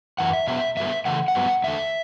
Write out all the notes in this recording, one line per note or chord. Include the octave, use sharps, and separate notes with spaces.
F#2 E3 F#5
E5
B2 F#3 B3 E5
G2 D3 F#3 B3 E5
C#3 E3 A3 F#5
F#5
G2 F#3 B3
E2 D3 A3 E5